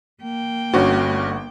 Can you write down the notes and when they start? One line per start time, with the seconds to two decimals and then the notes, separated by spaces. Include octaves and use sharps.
0.22 A#3 G5
0.74 G1 G2 C#4 F#4 D6